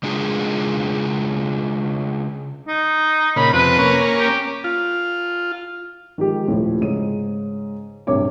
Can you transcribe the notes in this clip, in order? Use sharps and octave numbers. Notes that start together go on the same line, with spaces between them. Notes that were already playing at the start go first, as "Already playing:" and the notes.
C#3 G#3 D4 F4 G#4
D#4
A#2 C#3 B5
F2 C3 B4
A#3 C#4
G4
F4
D#3 F3 G#3 G4
D#1 A2 F3
G#2 C#3 D#7
D1 G2 C3 C#5 D6